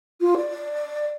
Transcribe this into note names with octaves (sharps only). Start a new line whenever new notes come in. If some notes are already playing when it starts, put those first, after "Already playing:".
F4
D5